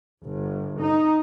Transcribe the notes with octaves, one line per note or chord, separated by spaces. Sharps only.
G1
D#4